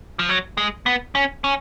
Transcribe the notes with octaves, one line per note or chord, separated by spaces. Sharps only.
F3
F#3
G#3
B3
C#4
C#4